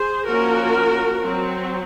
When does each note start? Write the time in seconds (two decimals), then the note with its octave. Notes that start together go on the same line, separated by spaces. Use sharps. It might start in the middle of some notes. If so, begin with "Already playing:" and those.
Already playing: G#4 C5
0.27 F3 A#3 C#4 F#4 A#4
1.22 F#3 C4